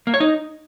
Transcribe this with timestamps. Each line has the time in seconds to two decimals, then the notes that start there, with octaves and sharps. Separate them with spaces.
0.07 A#3
0.14 C#5
0.20 D#4